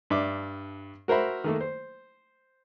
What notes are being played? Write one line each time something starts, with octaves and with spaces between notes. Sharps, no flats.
G2 D4 E5 D6
F#4 A#4 C5 E5 B5
D#3 A3 A#3
C5